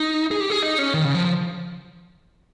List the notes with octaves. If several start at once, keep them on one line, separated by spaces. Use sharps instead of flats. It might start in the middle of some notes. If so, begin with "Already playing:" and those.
Already playing: D#4
G#4
G4
G#4
D#4
C#4
D#3
C#3
F3
F3